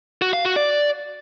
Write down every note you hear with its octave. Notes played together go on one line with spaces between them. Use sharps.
F#4
F5
F#4
D5